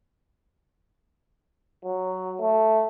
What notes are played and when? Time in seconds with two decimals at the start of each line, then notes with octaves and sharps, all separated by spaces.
1.84 F#3
2.40 A3